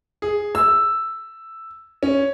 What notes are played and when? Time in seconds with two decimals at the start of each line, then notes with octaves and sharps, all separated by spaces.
0.22 G#4
0.55 E6
2.03 C#4